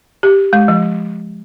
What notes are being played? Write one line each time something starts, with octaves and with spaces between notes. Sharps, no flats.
G4
G#3
F3